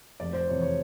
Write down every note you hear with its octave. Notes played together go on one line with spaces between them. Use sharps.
F1 D5
C5
E2 C3 F3 C#5
C#5